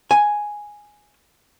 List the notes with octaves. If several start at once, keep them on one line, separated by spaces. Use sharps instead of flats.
G#5